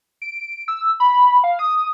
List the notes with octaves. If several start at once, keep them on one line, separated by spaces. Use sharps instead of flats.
D7
E6
B5
F5
D#6